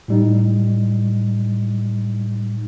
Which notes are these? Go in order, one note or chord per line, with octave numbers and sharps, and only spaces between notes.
A2 G3 D#4